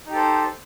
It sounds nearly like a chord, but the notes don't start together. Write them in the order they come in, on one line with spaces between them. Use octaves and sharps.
D#4 G4 A4 C5